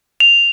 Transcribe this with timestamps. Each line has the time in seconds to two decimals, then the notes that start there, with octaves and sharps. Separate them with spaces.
0.20 F7